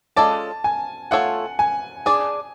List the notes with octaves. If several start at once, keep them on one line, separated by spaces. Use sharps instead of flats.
G#3 C#4 F4 A4 D5 A5
G#5
A3 F4 A4 C#5 F#5
G#5
D4 G#4 D5 G#5